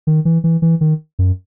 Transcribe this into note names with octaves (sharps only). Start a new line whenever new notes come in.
D#3
E3
E3
E3
D#3
F#2